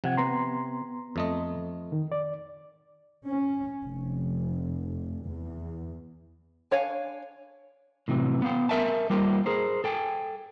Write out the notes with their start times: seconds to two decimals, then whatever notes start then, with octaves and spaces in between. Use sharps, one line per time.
0.04 C3 F3 F#5 G#6
0.17 B3 A#5 C6
1.16 F2 A3 D#5
1.92 D#3
2.12 D5
3.27 C#4
3.84 F1
5.26 E2
6.71 D4 C#5 F5 G#5
8.08 A2 C3 E3 F#3
8.42 B3 F5 G5
8.69 A#4 E5 G#5 A5
9.10 G3 A#3 F4 G4 A#4 C5
9.46 G#4 A#4 C5
9.84 A4 G5 G#5